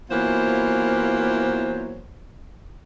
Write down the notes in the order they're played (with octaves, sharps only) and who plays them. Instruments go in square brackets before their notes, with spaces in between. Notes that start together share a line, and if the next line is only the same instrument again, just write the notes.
[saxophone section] E3 F#3 A#3 B3 F4 C5